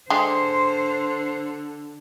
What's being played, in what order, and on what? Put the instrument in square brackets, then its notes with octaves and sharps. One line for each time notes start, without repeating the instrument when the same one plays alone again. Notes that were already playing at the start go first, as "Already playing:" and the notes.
[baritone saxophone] D3 [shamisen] G#3 D4 G4 [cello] C5 [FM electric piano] C6